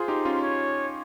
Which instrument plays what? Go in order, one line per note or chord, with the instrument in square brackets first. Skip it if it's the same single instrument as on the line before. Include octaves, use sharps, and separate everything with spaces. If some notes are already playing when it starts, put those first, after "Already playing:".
Already playing: [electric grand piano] F4 G#4 [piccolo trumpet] C5
[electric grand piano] D#4 G4
C#4 F4
[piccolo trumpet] C#5